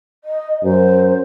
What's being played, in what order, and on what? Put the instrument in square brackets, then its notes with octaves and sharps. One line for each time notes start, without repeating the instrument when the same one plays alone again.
[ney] D#5
[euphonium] F#2 [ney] C5